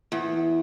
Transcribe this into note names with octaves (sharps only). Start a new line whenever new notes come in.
E2